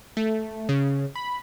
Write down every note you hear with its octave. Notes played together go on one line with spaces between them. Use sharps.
A3
C#3
B5